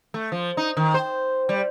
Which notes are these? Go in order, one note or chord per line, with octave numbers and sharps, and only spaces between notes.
A3
F3
D#4
D#3
C5
G3